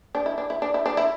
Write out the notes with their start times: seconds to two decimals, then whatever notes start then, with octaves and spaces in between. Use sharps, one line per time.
0.15 D4
0.26 E4
0.38 D4
0.50 E4
0.62 D4
0.74 E4
0.86 D4
0.97 E4